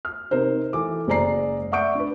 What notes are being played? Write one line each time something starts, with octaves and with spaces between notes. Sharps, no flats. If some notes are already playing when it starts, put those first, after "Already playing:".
F6
C3 D#4 A#4 C5
E3 A4 D6
F#1 G#3 C5 D5 A#5 C7
D5 E5 F#5 C#6 G6 D7
D4 B4